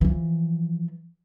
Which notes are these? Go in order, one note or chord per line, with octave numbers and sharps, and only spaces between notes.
E3 F3